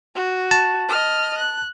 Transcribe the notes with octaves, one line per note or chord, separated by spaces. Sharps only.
F#4
A5
D#5 F6
F#6